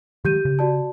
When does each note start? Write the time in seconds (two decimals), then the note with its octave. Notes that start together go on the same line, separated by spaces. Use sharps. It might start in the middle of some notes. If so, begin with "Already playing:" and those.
0.25 D#3 F#3 G#3 G4 G6 D#7
0.45 C#3
0.59 F#4 D5 A5